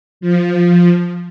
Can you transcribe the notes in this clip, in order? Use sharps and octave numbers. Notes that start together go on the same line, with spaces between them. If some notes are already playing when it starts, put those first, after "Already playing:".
F3